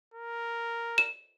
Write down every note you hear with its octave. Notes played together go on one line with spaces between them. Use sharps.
A#4
E7